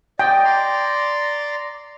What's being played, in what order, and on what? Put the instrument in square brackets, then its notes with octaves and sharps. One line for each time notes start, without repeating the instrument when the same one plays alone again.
[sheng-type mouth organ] D5 D#5 [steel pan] G5
[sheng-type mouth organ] D5 A#5 C6